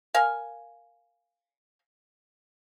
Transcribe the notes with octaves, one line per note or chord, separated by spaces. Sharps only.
A#4 F5 G#5